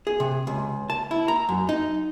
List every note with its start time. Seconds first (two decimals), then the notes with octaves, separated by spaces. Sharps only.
0.07 G#4
0.20 C3
0.47 C#2
0.90 A5
1.11 E4
1.28 A#5
1.49 F#2
1.69 D#4